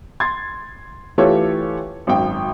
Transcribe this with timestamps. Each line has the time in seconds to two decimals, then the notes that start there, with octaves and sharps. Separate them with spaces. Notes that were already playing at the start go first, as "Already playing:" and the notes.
0.20 C6 G#6 A6
1.18 E3 A3 F4 G4 A4 C#5
2.07 G#1 F#2 G5